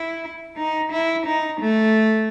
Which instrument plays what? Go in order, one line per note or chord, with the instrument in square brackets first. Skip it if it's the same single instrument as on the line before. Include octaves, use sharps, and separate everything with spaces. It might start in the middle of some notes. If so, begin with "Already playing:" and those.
Already playing: [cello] E4
D#4
E4
D#4
A3